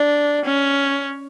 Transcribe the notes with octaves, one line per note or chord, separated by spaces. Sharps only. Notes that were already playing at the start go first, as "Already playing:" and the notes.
Already playing: D4
C#4